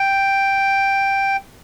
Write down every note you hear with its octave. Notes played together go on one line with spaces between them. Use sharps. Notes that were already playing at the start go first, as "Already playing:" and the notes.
Already playing: G5